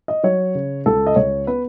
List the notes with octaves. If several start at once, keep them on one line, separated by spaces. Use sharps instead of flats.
D#5
F#3 C#5
C#3
C#2 A4
D#5
C#2 C#5
B3 B4